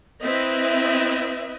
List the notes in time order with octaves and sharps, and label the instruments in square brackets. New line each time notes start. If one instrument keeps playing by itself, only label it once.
[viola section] C4 E4 B4 D#5 E5